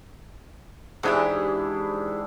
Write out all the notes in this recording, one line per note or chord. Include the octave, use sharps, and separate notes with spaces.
G#2 E3 D4 E4 G4 G#4